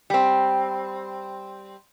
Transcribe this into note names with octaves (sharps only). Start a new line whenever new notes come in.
G3 C4